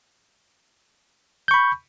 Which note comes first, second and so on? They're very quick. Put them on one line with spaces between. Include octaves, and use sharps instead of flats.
G6 C#6 B5